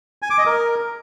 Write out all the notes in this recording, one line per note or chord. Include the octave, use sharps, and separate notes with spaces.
G#5
D6
D#5
A#4